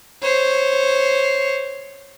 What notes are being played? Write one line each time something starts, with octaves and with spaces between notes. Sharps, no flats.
C5 C#5